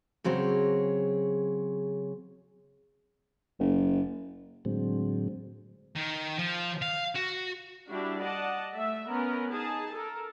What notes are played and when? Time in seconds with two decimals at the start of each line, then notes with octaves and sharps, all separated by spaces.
0.24 C#3 F#3 C4 G#4 C#5
3.59 F#1
4.65 A2 D3 F#3 G#3 C4
5.96 D#3
6.39 F3
6.82 F5
7.16 F#4
7.89 G3 D4 E4 F#4 G4
8.20 D5 D#5 F#5 A5
8.75 A3 E5
9.07 B3 C#4 A#4
9.51 D#4 G#4 A5
9.94 A4 A#4